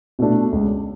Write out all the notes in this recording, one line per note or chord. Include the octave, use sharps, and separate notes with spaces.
B2 A3 D4
C#2